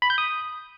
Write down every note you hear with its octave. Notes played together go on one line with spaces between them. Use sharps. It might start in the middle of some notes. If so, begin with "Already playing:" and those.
B5
G6
D#6